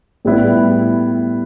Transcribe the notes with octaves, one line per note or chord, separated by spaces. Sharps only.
A2 G3 B3 E4